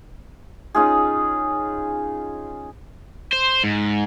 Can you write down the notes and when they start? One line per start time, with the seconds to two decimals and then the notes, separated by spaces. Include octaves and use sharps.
0.75 C#4 D#4 F4 G#4
3.33 C5
3.64 G#2